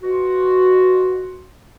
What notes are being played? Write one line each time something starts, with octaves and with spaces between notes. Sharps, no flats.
B2 F4 F#4